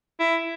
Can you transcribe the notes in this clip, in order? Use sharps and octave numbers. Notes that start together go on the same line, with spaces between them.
E4